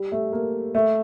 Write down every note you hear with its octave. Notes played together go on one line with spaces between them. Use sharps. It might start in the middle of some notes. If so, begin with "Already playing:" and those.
Already playing: G3
A3
A#3
A3